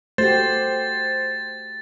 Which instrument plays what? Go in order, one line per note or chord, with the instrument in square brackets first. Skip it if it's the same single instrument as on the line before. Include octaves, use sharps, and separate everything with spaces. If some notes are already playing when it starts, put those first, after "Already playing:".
[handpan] A3 F#4 G4 [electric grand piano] C5 [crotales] A6